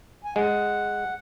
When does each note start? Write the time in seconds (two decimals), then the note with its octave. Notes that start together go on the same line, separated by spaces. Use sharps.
0.24 G#5
0.36 G#3 F#5